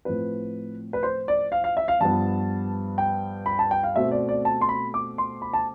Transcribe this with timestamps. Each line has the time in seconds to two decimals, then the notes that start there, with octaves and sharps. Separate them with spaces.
0.05 A2 F3 C4 B4
0.93 B4
1.03 C5
1.28 D5
1.52 F5
1.64 F5
1.77 E5
1.88 F5
2.00 G2 F3 B3 A5
2.98 G5
3.46 B5
3.59 A5
3.71 G5
3.83 F5
3.96 B2 A3 C4 E5
4.11 D5
4.29 D5
4.45 A5
4.61 C6
4.69 B5
4.94 D6
5.18 C6
5.42 B5
5.54 A5